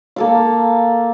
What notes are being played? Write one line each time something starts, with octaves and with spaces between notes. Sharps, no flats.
A#3 A4 F5